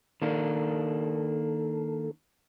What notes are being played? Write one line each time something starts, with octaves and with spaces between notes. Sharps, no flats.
D#3 A#3 D4 A4